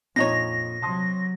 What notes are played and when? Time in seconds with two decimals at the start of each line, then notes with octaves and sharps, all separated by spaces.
0.16 F2 A#2 D4 D#4 C#5 D#5 A#6
0.82 C3 F#3 A5 C6 D#6